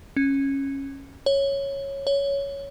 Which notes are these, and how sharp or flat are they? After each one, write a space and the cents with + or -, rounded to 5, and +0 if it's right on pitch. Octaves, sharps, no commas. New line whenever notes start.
C#4 -15
C#5 -5
C#5 +10